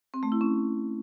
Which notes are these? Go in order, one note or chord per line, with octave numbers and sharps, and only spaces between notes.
C4
A3
E4
C#4